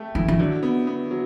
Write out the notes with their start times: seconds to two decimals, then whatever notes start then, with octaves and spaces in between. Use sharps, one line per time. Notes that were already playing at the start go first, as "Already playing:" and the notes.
Already playing: A3 G4
0.15 E3 E4
0.28 E3
0.39 D3 F#3
0.63 B3
0.87 B3
1.11 F#3